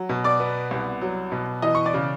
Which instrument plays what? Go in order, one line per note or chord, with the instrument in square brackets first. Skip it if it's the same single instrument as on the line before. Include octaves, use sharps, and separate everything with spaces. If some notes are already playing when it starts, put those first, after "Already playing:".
Already playing: [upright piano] F#3
B2
D5 D6
B3
C2
F#3
B2
E3 D#5 D#6
C#6
D5 D6
C#3